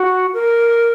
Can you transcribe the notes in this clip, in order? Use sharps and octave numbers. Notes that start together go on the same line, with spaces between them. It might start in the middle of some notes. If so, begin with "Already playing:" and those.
Already playing: F#4
A#4